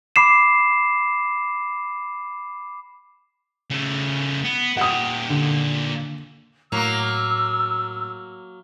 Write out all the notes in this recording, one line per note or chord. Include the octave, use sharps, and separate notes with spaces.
B5 D6 C7 E7
C#3 A3
B3
A#2 G4 F#5 D#6
D3
A2 F#3 A#3 E6